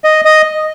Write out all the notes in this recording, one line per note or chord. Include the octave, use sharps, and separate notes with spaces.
D#5
D#5